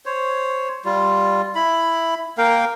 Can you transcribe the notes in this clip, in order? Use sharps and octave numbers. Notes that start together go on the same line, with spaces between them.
C5 C#5
G3 F4
E4 B5
A#3 A#4 F5 G5